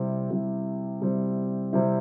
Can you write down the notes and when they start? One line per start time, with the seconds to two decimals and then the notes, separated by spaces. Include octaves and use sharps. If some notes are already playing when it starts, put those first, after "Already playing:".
Already playing: C3 G3 C4 E4
0.30 C3 G3 C4 E4
1.01 C3 G3 C4 E4
1.73 C3 G3 C4 E4